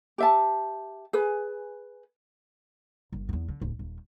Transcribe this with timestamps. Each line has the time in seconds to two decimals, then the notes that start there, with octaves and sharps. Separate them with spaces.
0.18 G4 E5 A5
1.13 G#4 B4
3.12 G1
3.29 E2 B3
3.49 D3
3.61 D1
3.79 D#1